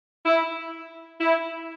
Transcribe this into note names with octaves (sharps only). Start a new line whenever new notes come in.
E4
E4